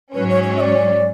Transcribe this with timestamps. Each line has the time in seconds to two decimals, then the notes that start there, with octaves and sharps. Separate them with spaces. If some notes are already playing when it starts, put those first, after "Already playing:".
0.14 G#2 F#3 C#4 B4
0.29 C#5
0.43 C#5
0.56 E5
0.60 D5